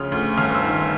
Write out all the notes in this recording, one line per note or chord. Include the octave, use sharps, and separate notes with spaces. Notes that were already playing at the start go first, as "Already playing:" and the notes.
Already playing: D2 C#3 F3 D#6 F6
D2
G1 F6
E6
D#3